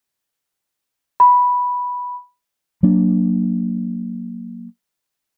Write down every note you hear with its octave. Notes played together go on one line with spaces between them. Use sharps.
B5
F#3 A#3 D4